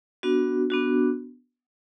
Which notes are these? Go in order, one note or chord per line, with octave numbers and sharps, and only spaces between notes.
B3 D4 F#4
B3 D4 F#4